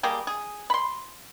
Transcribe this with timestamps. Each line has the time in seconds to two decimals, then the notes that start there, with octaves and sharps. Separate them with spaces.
0.03 G3 A#3 G4 G#4
0.27 G#4
0.70 B5 C6